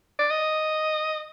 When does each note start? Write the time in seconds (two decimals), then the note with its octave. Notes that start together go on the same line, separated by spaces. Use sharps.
0.19 D5
0.31 D#5